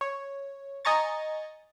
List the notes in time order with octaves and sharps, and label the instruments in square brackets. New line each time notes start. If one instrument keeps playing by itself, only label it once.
[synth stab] C#5
D#5 G#5 A#5 C#6 A6